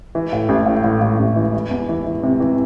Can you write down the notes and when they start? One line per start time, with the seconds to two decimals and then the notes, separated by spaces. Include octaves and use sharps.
0.15 E3
0.33 A2
0.49 A1
0.66 A2
0.84 A2
1.02 A2
1.19 A1
1.36 E3
1.54 E3
1.71 E2
1.89 E3
2.06 E3
2.23 C3
2.40 E3